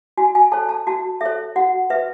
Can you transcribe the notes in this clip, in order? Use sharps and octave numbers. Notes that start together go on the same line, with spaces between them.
F#4 G#5
G#5
A4 C#5 A5
A5
F#4 A5
A4 C#5 E5
F#4 F#5
B4 E5